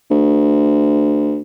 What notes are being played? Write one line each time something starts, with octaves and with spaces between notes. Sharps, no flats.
D2